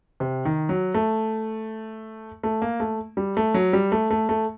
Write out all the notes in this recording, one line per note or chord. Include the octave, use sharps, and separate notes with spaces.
C3
D#3
F#3
A3
A3
A#3
A3
G3
A3
F#3
G3
A3
A3
A3